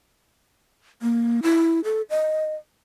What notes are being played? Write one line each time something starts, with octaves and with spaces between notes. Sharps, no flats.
A#3
E4
A4
D#5